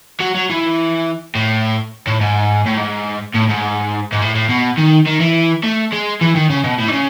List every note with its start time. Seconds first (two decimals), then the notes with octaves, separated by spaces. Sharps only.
0.20 F#3
0.35 F#3
0.50 E3
1.35 A2
2.07 A2
2.21 G#2
2.66 A2
2.78 G#2
3.35 A2
3.49 G#2
4.12 G#2
4.21 A2
4.35 A2
4.49 B2
4.77 D#3
5.07 D#3
5.21 E3
5.63 A3
5.92 G#3
6.21 E3
6.36 D#3
6.50 C#3
6.64 B2
6.78 A2
6.88 D#3
6.92 C#3